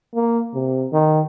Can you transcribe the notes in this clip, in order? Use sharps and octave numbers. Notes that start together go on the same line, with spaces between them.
A#3
C3
D#3